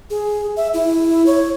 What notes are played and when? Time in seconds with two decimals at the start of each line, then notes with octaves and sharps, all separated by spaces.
0.10 G#4
0.57 E5
0.74 E4
1.26 C#5